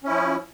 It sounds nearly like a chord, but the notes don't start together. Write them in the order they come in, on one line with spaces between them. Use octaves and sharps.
C#4 E4 F3